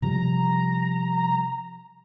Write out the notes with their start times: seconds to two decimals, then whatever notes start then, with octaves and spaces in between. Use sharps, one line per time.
0.02 C3 F3 G3 A#5